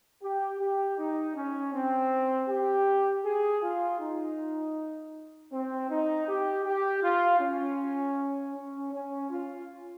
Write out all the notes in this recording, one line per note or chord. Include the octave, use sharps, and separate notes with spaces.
G4
G4
D#4
C#4
C4
G4
G#4
F4
D#4
C4
D#4
G4
G4
F4
C#4
C#4
C#4
F4